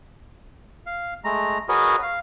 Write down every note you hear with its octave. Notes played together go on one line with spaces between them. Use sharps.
F5
G#3 A3 A#5
F#4 G#4 A#4 B4 C#5 D#5
F5